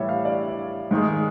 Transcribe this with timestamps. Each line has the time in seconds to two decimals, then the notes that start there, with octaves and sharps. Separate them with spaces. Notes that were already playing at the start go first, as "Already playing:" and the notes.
Already playing: A2 E3 G3 C#5 E5
0.09 F5
0.25 D5
0.91 G#2 D#3 G#3